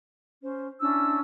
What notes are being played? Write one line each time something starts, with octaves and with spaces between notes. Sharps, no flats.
C#4 C5
C#4 D4 E4 E6